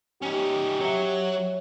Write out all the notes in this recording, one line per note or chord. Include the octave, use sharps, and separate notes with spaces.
C#4 D#4 G4
F#3 C#5 E5